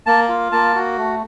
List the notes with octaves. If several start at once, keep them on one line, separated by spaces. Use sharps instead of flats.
A#3 A5
F4
A#3 A5
F#4
A3